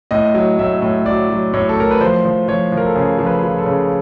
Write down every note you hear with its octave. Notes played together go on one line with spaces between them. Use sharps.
A2 D#5
F#3
A2 E5
A2
F#3 D5
F#3
A2 C#5
A4
A2 A#4
B4
F3 C5
F3
F3 C#5
F3
A#4
A4
C#3 G#4
F3
B4
F3
A4
C#3